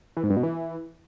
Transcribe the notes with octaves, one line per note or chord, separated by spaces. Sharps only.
E3
G#2
G2
B2
E3